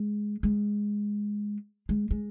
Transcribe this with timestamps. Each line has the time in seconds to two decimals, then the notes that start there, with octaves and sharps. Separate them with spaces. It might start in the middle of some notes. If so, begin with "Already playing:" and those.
Already playing: G#3
0.43 G#3
1.89 G#3
2.11 G#3